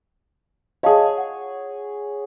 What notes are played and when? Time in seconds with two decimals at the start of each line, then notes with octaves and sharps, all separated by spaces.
0.83 G#4 C#5 D#5 F5 A5
1.18 F#5